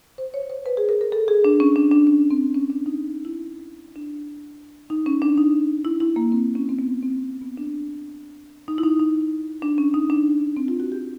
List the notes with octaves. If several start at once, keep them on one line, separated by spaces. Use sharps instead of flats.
C5
C#5
C5
B4
G#4
A#4
A#4
A4
G#4
D4
C#4
D4
D4
C#4
C4
C#4
D4
D#4
E4
D4
D#4
C#4
D4
D#4
E4
E4
A#3
C4
C#4
C4
B3
C4
B3
D4
D#4
E4
D#4
D#4
D4
C#4
D#4
D4
C4
F4
F#4
G4